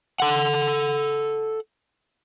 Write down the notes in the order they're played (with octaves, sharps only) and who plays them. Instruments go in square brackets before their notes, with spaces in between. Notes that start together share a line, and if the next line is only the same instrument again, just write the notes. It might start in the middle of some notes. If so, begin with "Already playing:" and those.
[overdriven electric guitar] A4 F#5